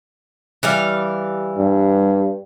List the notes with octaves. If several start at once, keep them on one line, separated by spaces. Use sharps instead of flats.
E3 G3 F5
G2